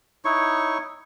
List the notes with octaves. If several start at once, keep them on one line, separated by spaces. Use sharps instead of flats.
D#4 E4 C#5 C#6